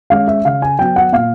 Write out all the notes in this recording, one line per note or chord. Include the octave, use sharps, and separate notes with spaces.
G#3 C#4 F5
E5
C#3 F5
G#5
F#3 B3 G5
F#5
A#2 F5